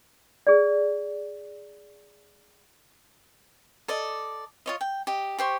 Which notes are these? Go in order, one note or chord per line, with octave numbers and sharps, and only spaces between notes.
G#4 D5
A4 D5 D#5
F4 C#5 D#5
G5
G4 D#5
G4 C5 C#6